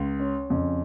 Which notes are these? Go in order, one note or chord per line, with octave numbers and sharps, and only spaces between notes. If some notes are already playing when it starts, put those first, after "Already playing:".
Already playing: C#2 C#3
C#4
F2 C#3